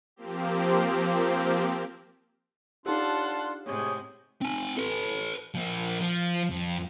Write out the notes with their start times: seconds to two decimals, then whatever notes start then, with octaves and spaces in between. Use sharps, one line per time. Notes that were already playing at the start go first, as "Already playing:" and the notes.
0.16 F3 A#3 C4 G4
2.86 D4 D#4 F4 G4 F#5 A5 C6
3.66 A2 C3 G#3 G#4 C#5
4.42 C4 G#5
4.78 A4 B4
5.55 F3 A#3
6.00 F3
6.50 F2